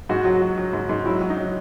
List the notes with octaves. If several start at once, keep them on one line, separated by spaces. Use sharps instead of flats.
G#2 F#4
F#3
F#3
F#3
G#2
G#2
F#3 E4
F#3
D#4
F#3